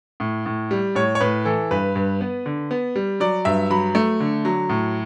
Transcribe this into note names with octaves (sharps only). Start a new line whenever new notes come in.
A2
A2
G3
A2 C#5
C#5
A2 B4
E3 A4
G2 B4
G2
B3
D3
B3
G3
F#3 D5
G2 E5
F#3 B5
A3
D3
F#3
A2